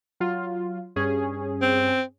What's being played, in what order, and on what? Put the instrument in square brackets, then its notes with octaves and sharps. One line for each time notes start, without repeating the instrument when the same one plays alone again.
[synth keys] F#3 F4
G2 C#4 G#4
[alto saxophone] C4